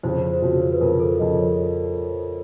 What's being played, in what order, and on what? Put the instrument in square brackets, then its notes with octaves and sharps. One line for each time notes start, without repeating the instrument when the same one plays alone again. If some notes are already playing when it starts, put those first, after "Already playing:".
[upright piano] F2 C#3 F3 [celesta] C5
[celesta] C5
[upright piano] F2 C#3 F3 [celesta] F#4
[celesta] C5
B4
[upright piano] F2 C#3 F3 [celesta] A#4
[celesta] A4
[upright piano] F2 C#3 F3 [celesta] D#5
[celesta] C#5